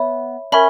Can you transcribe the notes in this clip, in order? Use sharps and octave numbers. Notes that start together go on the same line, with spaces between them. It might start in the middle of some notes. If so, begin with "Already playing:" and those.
Already playing: B3 C#5 E5 B5
C#4 A#4 E5 B5